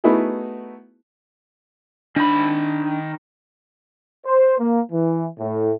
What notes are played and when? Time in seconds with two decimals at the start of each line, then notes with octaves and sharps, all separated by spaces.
0.04 A3 B3 D#4 E4 F#4 G#4
2.16 D#3 D4 B5
4.26 C5
4.59 A#3
4.92 E3
5.39 A2